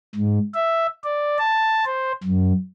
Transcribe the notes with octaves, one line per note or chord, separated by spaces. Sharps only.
G#2
E5
D5
A5
C5
F#2